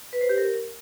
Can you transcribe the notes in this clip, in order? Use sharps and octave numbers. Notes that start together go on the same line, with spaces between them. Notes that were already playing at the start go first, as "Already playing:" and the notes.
B4
C5
G4
A#4